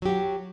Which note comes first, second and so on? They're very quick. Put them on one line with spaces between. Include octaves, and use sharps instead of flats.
F#3 G4 F#4